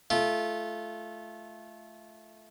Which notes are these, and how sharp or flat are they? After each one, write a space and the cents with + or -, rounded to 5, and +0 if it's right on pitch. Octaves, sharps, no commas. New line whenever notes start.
A3 -15 F4 -20